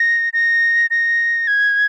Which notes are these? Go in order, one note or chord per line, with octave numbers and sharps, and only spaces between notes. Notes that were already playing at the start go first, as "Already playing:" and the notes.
Already playing: A#6
A#6
A#6
G#6